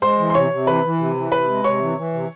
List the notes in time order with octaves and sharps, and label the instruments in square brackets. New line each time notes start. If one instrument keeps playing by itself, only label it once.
[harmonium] G#3 [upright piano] C5 C6
[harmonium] E3
[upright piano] C6
[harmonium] C3 [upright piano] C#5 C#6
[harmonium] C3
[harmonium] E3 [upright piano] B4 B5
[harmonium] E3
C3
E3
[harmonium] C3 [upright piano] B4 B5
[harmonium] G#3
[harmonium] C3 [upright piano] C#5 C#6
[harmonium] E3
E3
C3